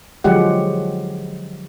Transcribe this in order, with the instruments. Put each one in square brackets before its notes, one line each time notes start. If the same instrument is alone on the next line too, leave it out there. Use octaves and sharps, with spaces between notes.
[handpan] D3 F3 F#3 G#3 G4 F#5